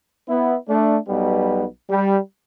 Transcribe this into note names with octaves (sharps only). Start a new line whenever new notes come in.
B3 E4
A3 D4
B1 B2 G3 B3
G3